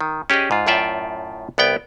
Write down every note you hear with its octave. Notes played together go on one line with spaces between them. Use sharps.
D#3
C#4 G4 G#4 D5 D#5
G#2 F4
F#2 A2 F4 D5 E5 G5
C2 B3 D5 G5